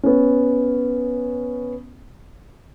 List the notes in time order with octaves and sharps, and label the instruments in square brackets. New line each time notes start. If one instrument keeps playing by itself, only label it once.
[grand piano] B3 C#4